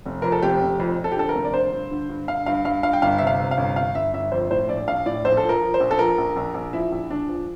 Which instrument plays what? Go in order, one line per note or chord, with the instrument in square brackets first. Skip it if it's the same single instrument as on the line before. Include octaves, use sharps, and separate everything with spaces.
[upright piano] F1
F2 A#4
A4
F1 G4
F1
F2
F2
A4
G4
D3 A4
A#4
F1
D5
D3 C5
G2
D3
G2
D3 F5
G2 F5
G2 F5
G2 F5
G5
G1 F5
C3 E5
F5
C3
F5
G1
G1 F5
G1 E5
G1 E5
F2 C5
A2 C5
A#1 D5
A#1 F5
A2 D5
A#1 C5
A4
F3
A#4
F3
C5
A#1
A4
F3 A#4
A#1
A#1
A#1
F3 E4
A#1
A#1 D4
F3